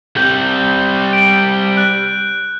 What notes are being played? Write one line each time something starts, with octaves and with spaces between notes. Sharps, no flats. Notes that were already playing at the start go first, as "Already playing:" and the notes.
G3 C4 G6
D7
F#6